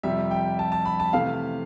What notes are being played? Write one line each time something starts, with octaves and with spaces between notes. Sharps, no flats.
F2 C3 G3 E5
G5
A5
A5
B5
A5
C3 E3 A3 F5